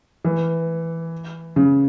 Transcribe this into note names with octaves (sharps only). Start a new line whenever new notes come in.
E3
C#3